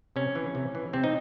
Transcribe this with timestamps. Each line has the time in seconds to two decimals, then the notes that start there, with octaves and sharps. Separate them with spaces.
0.16 C3 C#4
0.35 E3
0.55 C3
0.75 E3
0.93 C3 C4
1.04 D#4